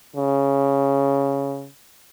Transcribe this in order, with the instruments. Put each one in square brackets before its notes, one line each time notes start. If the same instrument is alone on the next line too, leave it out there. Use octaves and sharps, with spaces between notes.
[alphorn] C#3